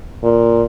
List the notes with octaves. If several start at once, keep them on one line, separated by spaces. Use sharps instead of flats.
A#2